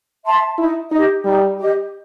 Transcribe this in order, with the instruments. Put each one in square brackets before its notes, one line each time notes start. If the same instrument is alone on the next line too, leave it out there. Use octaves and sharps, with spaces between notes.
[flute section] E5 A5 C6
[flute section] D#4 [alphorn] E4
[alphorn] D#4 [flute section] G4 D#5
[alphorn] G3 [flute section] D#4
[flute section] G4 D#5